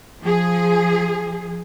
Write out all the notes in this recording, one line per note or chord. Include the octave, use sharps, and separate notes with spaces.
F3 G#4